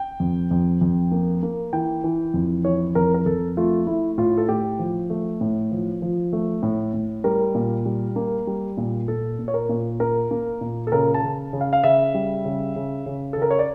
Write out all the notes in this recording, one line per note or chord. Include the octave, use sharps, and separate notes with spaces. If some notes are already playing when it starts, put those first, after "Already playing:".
Already playing: G5
F2
F2
F2
A#3
A#3
E3 G5
E3
F2
E3 C#5
F2 A#4
A#4
F2 A4
A3 F4
A3 E4
A2 F4
A4
A2 G4
F3
A3
A2
F3
F3
A3
A2
A2
G3 A#4
A#2
G3
A#3
G3
A#2
A#2 A4
A#2
C#5
A#4
A#2
A#3 A#4
A#3
A#2
A4
C#3 A#4
A5
C#3
C#3
F5
F5
C#3 E5
G3
C#3
C#3
C#3
C#3 A4
A#4
C#5
D5